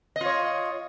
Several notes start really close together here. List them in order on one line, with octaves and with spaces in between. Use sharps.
D#5 F4 C#5